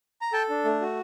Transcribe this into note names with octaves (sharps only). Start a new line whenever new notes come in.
A#5
A4 G5 A5
D4
A3
F#4